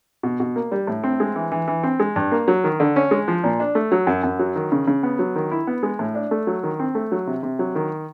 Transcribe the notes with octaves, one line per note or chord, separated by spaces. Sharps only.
B2
B2
A#3
G3
A2
C4
G#3
E3
E3
E3
C4
G#3
G2
A#3
F#3
D#3
D3
C#4
G#3
F3
A#2
D4
A3
F#3
F#2
F#2
F#3
D#3
C#3
C#3
B3
F#3
D#3
E4
B3
G#3
A2
D4
A3
F#3
D#3
C4
A3
F#3
C3
C3
F#3
D#3